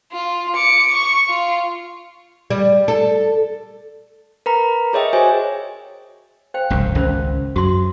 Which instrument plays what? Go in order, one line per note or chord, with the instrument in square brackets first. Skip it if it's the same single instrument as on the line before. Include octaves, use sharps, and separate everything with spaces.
[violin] F4
D6 C#7
C#6
F4
[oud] G3
A4
[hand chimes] A#4 B4 A#5
G#4 C#5 D#5 E5 G5
F#4 G#4 C5 C#5 D#5 G#5
[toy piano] C5 F5 G5
[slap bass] E1 C2 F#2
[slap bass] G#1 C#2 [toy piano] C#4 A#4 C5
[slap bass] F#2 F#3 [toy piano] F#4 C6